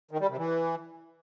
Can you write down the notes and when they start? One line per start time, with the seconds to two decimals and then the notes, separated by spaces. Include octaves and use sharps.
0.11 D#3
0.20 G3
0.29 C3
0.38 E3